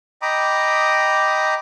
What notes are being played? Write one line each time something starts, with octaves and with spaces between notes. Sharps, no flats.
D#5 G5 A#5 B5 D6 D#6